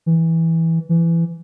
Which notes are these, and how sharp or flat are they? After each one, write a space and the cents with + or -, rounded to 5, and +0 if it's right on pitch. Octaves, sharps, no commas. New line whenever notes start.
E3 -10
E3 +20